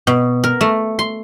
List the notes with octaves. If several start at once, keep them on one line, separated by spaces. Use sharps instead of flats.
B2
A#4
A3
C6